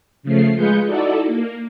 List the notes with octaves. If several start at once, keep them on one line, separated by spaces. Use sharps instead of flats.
C#3 F3 A3 C7
G#3 F4 G#4 B4 G6 C#7
D#4 E4 F#4 A4 D5
A#3